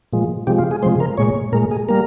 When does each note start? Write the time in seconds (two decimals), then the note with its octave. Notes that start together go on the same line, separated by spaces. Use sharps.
0.13 A#2 F3 G#3
0.47 C3 F3 G#3 G4
0.59 F4
0.71 G#4
0.83 C3 F3 G#3 C5
1.00 A#4
1.17 A#2 G#3 C#5
1.52 A#2 G#3 A#4
1.71 G#4
1.89 G3 A#3 A#4